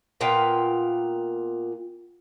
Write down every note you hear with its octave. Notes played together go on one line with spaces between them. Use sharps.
A#2 B3 F4 G5